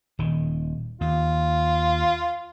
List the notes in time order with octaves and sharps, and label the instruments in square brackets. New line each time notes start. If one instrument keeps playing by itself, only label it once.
[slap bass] D#1 D#3
[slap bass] D#2 [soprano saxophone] F4